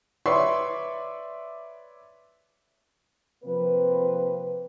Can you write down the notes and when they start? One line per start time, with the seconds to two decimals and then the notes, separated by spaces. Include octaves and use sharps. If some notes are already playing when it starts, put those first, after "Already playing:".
0.26 B4 C#5 D5 E5 C6 C#6
3.45 C3 F3 A#3 C4 B4